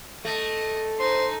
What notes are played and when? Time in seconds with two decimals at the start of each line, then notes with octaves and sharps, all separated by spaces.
0.25 A3 D#5
0.99 D#4 C5 C6